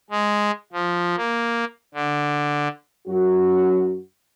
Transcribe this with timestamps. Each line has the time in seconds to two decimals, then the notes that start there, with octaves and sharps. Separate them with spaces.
0.11 G#3
0.73 F3
1.17 A#3
1.95 D3
3.08 F#2 F#3 F#4